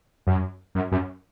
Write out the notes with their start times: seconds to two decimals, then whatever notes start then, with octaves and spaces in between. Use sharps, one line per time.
0.27 F#2
0.75 F#2
0.92 F#2